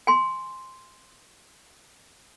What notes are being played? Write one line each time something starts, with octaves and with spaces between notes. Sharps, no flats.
G#5 C6